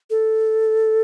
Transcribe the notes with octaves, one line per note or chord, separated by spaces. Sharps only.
A4